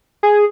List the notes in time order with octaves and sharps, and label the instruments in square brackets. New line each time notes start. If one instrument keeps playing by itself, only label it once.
[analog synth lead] G#4